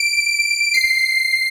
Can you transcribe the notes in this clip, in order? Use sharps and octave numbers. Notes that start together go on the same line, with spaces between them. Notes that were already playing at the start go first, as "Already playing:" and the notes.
Already playing: D7
C7